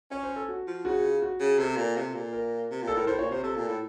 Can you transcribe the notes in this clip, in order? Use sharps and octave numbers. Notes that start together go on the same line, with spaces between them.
C#4 C#5
C5
A4
F#4
F3
C#3 F#4
F4
F#4
C#3
C3 A4
A#2
C3
A#2
A#4
C3
A#2
A4
A2 A#4
A2 C5
A#2 C#5
C3 C5
C3 A4
A#2
A2